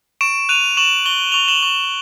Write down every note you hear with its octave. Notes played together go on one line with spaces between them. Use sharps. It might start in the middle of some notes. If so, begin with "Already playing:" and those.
C#6 D7 E7
F#6 D#7 F7
C#6 E7 F#7
C#6 G7
C#6 F7 G7
E7 F#7
C#6